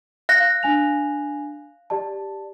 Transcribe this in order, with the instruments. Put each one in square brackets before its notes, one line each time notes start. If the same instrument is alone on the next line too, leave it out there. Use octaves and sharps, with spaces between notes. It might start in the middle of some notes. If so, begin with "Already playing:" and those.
[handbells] F5 F#6 A#6
[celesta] D4 G#5 F7
G4 D5 A5